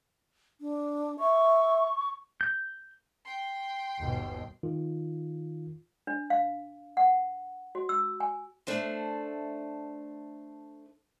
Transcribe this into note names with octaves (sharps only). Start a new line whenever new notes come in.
D4
E5 C#6
G6
G5 C6
G1 D#2 B2
D#3 F4
D4
F5
F#5
F#4
E6
G#5
A3 D4 A4 C5